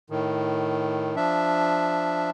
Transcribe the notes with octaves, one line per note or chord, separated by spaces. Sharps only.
A2 D#3
F3 D4 E5